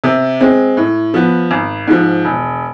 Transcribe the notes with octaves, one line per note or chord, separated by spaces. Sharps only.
C3
G#3 C4
A2
F3 B3
G#1
G#2 F3
E1